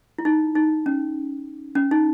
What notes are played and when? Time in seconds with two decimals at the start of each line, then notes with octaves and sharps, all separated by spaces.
0.18 E4
0.25 D#4
0.55 D#4
0.86 C#4
1.75 C#4
1.91 D#4